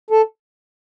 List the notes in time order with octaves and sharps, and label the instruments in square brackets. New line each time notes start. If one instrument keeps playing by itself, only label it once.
[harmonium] A4